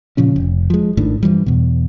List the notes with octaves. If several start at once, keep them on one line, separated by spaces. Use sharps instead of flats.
A#2 C#3 F3 C#4
F1
F3 G#3
G#1 A2 D#3 D4
G2 E3 F3 G3
E2 B2